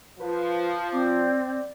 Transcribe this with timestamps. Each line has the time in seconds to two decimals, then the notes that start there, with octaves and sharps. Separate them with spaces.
0.20 F3 B4
0.92 C4 D5